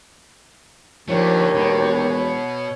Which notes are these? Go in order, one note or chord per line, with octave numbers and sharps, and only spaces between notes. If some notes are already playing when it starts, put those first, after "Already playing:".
D#2 D3 F3 A3 C#5
E1 B2